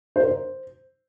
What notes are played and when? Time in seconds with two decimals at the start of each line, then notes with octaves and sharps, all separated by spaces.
0.16 C5
0.21 A#4
0.27 C5